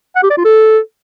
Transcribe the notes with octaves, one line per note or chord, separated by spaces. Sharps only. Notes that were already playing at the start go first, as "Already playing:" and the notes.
F#5
G4
D5
F4
A4